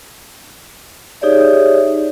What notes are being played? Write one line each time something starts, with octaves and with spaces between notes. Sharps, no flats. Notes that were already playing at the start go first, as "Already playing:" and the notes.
D#4 G4 G#4 C#5 D5 E5